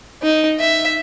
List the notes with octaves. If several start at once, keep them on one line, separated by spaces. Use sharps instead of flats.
D#4
E5